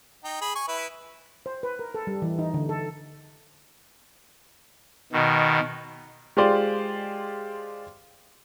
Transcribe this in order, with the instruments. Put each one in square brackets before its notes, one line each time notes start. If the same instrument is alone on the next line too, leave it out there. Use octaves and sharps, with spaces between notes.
[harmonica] D#4 G5
G#4 B5
G#5 C#6
E4 B4
[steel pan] C5
B4
A#4
A4
G3
E3
D#4
D3
A4
[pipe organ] B2 D#3
[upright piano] G#3 F4 G4 C5 D5